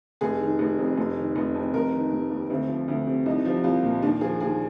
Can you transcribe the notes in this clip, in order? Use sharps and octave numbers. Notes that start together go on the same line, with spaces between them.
F1 G#4
D#3
F1
F2
F1
D#3
F1
F2
F1 A#4
D#3
F1
D#2
D2 C4
F3
D2
C3
C2 D#4
F3
C2 F4
A#2
D#2 D4
F3 G#4
D#2 G#4